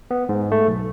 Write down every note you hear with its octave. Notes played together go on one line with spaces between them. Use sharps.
B3
G#2
A3
B1